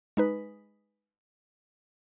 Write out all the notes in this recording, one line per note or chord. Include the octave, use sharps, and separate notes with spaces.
G#3 D#4 B4